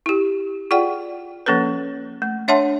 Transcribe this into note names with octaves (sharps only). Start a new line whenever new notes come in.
E4 G4
F4 G#4 D5 F#5 G5
F3 A#3 C#4 A4 B4
A3
D4 C#5 E5 F#5 A5 C6